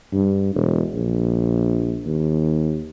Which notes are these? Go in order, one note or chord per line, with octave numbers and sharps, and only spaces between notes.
G2
E1
A#1
D#2